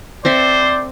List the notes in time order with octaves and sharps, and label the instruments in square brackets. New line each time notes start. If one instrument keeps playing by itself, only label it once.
[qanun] C4 A4 E5 [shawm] C5 [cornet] D5